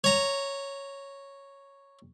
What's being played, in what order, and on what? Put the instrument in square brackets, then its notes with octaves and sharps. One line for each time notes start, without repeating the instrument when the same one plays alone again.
[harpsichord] C#5 A#5